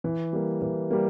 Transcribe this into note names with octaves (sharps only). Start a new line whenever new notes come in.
E3
G3 A#3
E3
G3 A#3